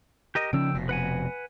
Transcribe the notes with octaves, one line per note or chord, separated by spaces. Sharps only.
G4 A#4 D#5
C#3 F3 C#4 G5 E6
F1 B2
B4 F#5 G#5